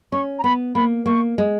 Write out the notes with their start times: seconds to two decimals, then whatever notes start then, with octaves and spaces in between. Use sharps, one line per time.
0.12 C#4 C#6
0.39 A#5
0.44 B3 B5
0.75 A#3 B5
1.06 A#3 C#6
1.38 G#3